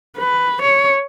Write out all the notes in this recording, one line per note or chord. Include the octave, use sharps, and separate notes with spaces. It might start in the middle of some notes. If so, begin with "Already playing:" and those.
B4
C#5